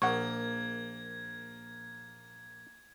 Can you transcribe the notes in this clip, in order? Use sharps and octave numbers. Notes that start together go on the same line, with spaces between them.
A#1 A#3 F#5 C#6 G#6